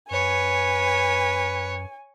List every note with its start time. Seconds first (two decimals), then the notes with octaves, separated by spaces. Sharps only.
0.11 F#2 B4 C#5 G#5